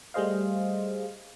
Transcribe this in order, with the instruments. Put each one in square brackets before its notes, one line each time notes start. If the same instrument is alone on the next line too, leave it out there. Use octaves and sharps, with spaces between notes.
[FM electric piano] G3 A3 G#4 C5 D#5 F5